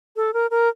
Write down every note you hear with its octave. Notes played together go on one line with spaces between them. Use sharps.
A4
A#4
A#4